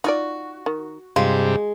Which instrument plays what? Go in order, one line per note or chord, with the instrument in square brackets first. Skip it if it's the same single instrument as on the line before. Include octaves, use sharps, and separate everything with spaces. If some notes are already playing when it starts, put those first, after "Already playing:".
[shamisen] D#4 F4 D5 [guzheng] F#4
[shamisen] D#3
[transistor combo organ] G2 C3 [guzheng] G#3 [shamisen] F4